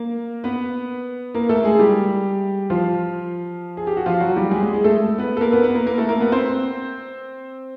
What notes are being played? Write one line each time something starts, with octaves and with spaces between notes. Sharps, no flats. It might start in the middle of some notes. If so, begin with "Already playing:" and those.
Already playing: A#3 A#4
B3 B4
A#3 A#4
A3 A4
G#3 G#4
G3 G4
F3 F4
G#4
G4
F#4
F3 F4
F#3 F#4
G3 G4
G#3 G#4
G#3 G#4
G#3 G#4
A3 A4
B3 B4
A4
A#3 A#4
B3 B4
B3 B4
A#3 A#4
A#3 A#4
A3 A4
A#3 A#4
B3 B4
C4 C5